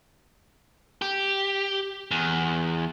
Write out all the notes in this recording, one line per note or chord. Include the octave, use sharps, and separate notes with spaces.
G4
E2